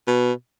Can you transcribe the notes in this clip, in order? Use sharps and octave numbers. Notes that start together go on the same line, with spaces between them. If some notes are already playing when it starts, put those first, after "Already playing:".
B2